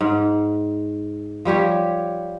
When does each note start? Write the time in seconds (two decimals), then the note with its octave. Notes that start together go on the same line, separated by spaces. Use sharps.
0.01 G#2
1.45 F3 G3 G4 C#5